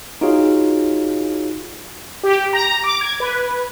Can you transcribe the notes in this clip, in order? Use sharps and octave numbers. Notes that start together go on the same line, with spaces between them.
D#4 F4 F#4 G#4 C#5 F5
G4
A#5
D6
G#6
B4